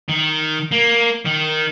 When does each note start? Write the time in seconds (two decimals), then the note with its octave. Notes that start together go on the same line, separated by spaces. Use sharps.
0.09 D#3
0.72 A#3
1.26 D#3